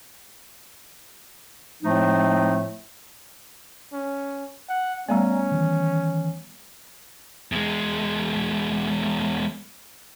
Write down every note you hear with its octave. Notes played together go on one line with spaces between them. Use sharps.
A2 F3 G#3 A3 C4 D#4
C#4
F#5
G3 A3 B3 C#4 D5 G#5 A#5
D#3 E3
E2 G#3